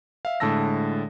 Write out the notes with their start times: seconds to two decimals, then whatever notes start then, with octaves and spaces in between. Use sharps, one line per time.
0.25 E5 F5
0.40 A2 D3 G#3 A5 E6 A#6